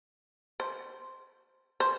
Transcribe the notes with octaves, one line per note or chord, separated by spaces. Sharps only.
C5
C5